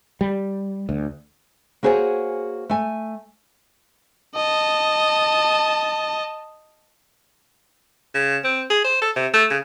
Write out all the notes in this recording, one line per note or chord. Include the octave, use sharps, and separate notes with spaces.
G3
D2
A#3 F#4 G#4 C5 C#5 G#5
A3 G#5
D#5 A5
C#3
C4
G#4
C5
A4
C3
A3
C#3